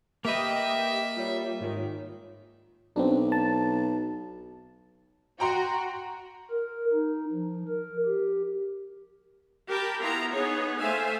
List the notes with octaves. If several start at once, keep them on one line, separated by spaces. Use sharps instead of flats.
A#3 G4 B4 D#5 E5 G5
G3 F4 C#5
G#2 D#3
B1 C4 D4
A5
F#4 G5 A#5 C6
A#4
D#4
F3
A#4
G4
G4 A#4 G5 A5 B5
B3 E4 F4 A#5
B3 D#4 G#4 C#5
A3 C5 E5 F5 G#5